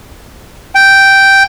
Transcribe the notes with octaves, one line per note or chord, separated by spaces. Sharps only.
G5